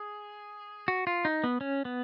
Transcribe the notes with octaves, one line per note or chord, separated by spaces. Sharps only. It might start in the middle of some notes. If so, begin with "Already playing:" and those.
Already playing: G#4
F#4
F4
D#4
B3
C#4
B3